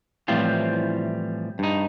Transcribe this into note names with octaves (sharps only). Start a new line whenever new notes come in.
A2 E3 F3 G3 C4 F4
G2 D#4